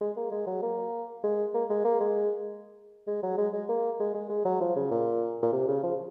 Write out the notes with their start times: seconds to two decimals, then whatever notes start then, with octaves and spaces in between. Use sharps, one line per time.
0.01 G#3
0.17 A#3
0.32 G#3
0.47 F#3
0.62 A#3
1.24 G#3
1.54 A#3
1.70 G#3
1.85 A#3
2.01 G#3
3.07 G#3
3.23 F#3
3.38 G#3
3.53 G#3
3.69 A#3
4.00 G#3
4.15 G#3
4.30 G#3
4.45 F#3
4.61 F3
4.76 C#3
4.91 A#2
5.42 A#2
5.53 C3
5.68 C#3
5.83 F3